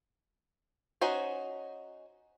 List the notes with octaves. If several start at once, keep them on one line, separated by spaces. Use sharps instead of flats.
C#4 D#4 F#4 C5